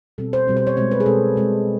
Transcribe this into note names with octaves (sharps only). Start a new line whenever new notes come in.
B2 G3 C4 A4
C5
B2 G3 C4
C5
C#5
B2 G#3 C4 C5
B4
G#4
B2 G#3 C4 A4
B2 G#3 C4